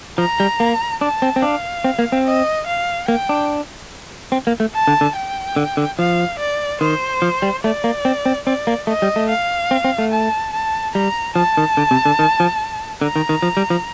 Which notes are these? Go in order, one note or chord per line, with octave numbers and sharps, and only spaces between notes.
F3 A#5
G3
A#3
D4 A5
C4
C4
D4 F5
C4
A#3
C4
D#5
F5
A#3 G5
D4
C4
A#3
A3
A5
D3
D3
G5
D3
D3
F3 F5
D5
D#3 C5
F3
G3
A3 D5
A#3
C4
C4
C4 D5
A#3
A3 D#5
G3
A3
F5
C4
C4
A3
A5
A5
G3 A#5
F3 A5
D#3
D3
C3
D3
D#3
F3
D3 A#5
D#3
D#3
F3
G3
F3